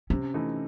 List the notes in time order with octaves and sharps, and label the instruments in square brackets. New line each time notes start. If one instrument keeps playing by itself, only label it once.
[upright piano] C3 [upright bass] C#4
[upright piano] E3 A3 D#4